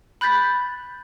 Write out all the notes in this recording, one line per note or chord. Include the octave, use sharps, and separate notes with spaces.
B5 F#6 G6 A6 B6